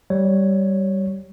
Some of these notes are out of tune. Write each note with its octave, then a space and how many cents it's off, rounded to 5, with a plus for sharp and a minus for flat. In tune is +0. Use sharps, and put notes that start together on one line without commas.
G3 -10 C#5 +0